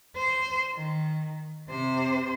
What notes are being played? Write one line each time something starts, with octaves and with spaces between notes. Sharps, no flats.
C5
D#3
C3 C5